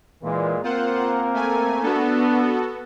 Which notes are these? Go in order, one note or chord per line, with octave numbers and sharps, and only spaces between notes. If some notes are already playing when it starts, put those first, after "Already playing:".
A#2 E3 G#3
A#3 C4 F4 A#4 C5 F#5
A3 G#5
B3 D4 F#4 A4